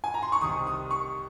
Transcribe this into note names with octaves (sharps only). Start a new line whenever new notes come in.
G#5
A#5
C6
C#6
C2 C3 D#3 D#6
D#6
C#6